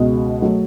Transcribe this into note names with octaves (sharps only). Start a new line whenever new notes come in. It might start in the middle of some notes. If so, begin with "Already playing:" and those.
Already playing: C#2 B2 G#3
F#3 A3